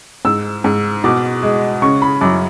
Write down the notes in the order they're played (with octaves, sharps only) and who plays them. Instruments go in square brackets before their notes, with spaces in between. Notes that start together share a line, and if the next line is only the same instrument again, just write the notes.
[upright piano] G#2 E6
G#2
B2 D6
G#3
C#3 C#6
B5
F#2 D6